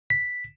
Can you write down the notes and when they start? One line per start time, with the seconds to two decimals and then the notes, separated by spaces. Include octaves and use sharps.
0.10 B6